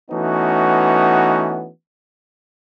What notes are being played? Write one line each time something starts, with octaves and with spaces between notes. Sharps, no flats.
E3 A3 B3 C#4 D#4 F#4